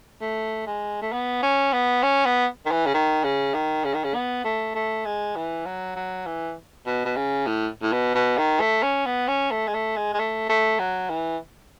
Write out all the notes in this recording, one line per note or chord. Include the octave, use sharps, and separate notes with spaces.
A3
G#3
A3
B3
C#4
B3
C#4
B3
D#3
E3
C#3
D#3
C#3
D#3
C#3
D#3
C#3
B3
A3
A3
G#3
E3
F#3
F#3
E3
B2
B2
C#3
A2
A2
B2
B2
D#3
A3
C#4
B3
C#4
A3
G#3
A3
G#3
G#3
A3
A3
F#3
E3